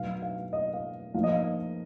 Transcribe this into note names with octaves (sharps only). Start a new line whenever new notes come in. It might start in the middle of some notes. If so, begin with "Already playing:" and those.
Already playing: B2 F#3 B3 D#4 F5
F5
D#5
F5
F3 A#3 D#4 F5
D#5
F5